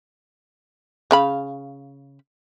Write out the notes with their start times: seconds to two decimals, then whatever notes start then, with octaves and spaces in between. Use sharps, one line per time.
1.11 C#3 F5 B5